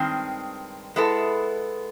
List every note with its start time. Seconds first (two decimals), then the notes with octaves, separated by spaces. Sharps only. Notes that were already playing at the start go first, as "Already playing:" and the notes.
Already playing: G2 D#3 G#3 C4
0.96 G#3 B3 E4 A4